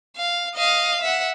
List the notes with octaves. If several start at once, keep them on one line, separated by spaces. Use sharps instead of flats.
F5
D#5 F5
E5 F#5